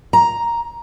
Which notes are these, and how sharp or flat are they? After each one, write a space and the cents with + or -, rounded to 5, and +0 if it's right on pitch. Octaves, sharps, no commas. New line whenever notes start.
A#5 +5